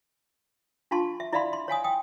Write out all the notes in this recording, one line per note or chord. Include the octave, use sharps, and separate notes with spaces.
D4 F4 F5 A5 C6 C#6
E5
E4 D5 E5 F5 B5 C6
C6
C#5 F5 G#5 D#6
G5 D#6